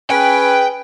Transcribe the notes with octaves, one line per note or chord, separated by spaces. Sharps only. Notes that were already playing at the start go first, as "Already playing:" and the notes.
C#4 G#4 B4 G5